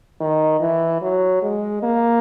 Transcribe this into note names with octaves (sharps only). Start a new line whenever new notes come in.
D#3
E3
F#3
G#3
A#3